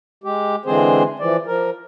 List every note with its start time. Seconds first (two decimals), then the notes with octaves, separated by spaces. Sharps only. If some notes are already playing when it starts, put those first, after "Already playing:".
0.24 G#3 G4
0.66 D3 E3 G#3 C4 G#4 C5
1.19 E3 F3 D5
1.47 F3 A#4